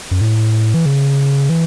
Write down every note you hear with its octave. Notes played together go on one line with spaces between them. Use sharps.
F#2
A2
E3
C#3
E3